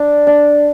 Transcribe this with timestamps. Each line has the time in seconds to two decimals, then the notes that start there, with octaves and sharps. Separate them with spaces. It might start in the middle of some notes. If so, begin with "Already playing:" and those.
Already playing: D4
0.27 D4